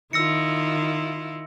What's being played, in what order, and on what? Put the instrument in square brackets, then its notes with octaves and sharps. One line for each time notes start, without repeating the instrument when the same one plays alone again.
[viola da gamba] D#3 E4 F4 [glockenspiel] E6 A#6 C#7